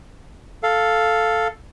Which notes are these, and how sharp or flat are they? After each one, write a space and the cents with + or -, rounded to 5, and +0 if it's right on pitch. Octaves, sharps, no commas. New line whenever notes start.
A4 +0 F5 +0